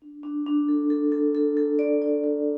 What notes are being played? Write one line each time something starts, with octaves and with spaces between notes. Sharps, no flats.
D4
D4
D4
A4
A4
A4
A4
A4
D5
D5
D5